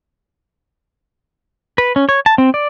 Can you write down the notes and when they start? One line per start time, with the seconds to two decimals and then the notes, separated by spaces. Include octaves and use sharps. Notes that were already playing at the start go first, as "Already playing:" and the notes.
1.78 B4
1.96 C#4
2.09 C#5
2.26 A5
2.38 C4
2.54 D5